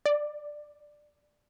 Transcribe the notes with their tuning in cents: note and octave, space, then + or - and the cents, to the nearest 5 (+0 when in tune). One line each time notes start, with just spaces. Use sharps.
D5 +10